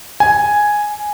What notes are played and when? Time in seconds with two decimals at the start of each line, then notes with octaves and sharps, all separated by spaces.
0.20 G#5